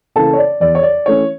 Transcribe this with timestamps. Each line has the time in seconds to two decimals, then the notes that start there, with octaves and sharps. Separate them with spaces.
0.16 C#3 E3 A#3 C#4 A4 A5
0.33 C#5
0.38 D5
0.60 E2 D5
0.75 C#5
0.83 D5
1.06 E3 A3 C#4 C#5